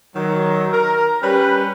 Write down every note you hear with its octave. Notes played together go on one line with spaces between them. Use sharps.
D#3 F#3
A#4
G3 C#4 B4